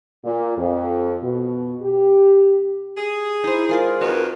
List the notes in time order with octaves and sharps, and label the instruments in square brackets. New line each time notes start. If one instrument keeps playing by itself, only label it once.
[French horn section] A#2
F2
B2
G4
[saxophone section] G#4
[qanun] D#4 C5 [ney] E4
[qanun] G#3 F4 D5 [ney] A#4
[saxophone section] F2 D#3 B4 [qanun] F#4